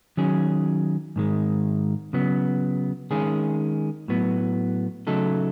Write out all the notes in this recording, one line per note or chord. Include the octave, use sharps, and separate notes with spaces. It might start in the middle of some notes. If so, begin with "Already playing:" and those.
D#3 F#3 C#4 G#4
G#2 D#3 G#3
C#3 F#3 B3
D#3 G#3 C#4 G#4
A2 F#3 B3
C#3 F#3 A3 D#4 A4